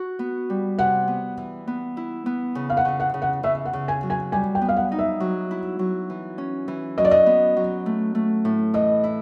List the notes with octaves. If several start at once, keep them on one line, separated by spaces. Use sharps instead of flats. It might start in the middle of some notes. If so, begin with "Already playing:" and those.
Already playing: F#4
B3
G3
C3 F#5
B3
E3
B3
E4
B3
C#3
F5
F#5
C#3
F#5
C#3
F#5
C#3 E5
F#5
C#3
G#5
F#3
G#5
G3 G#5
G5
B3
F5
F#5
D#4
E5
F#3
E4
F#3
E3
C#4
E3
F#3 D#5
D5
D#5
B3
F#3
A3
A3
A2
E3 D#5
E4